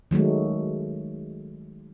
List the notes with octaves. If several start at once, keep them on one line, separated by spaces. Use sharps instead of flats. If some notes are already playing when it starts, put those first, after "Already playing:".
D#3 F#3 G#3 A3